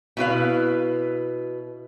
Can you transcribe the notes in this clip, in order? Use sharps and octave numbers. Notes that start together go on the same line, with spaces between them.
B2 E4 B4 F5